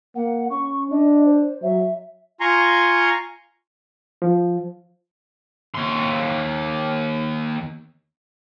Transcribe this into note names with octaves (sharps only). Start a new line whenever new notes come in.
A#3 F#5
C#4 C#6
D4 D#5
C5
F#3 E5
F4 G#5 A#5 C6 C#6
F3
D#2 C6